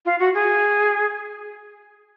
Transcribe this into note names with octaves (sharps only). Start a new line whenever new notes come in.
F4
F#4
G#4